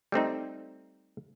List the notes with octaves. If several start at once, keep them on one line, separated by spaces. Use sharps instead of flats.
G3 A3 C4 D#4